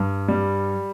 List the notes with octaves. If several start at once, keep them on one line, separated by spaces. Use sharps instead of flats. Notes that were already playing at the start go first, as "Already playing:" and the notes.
Already playing: G2
G3